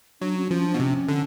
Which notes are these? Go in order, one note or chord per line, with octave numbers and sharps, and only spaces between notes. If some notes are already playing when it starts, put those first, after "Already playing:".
F#3 D4
C#4
D4
F3 C#4
D4
B2
C3 C#4
D3